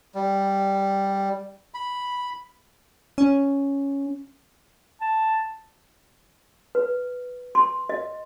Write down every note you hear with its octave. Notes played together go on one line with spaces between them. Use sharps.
G3
B5
C#4
A5
B4
C6
D#5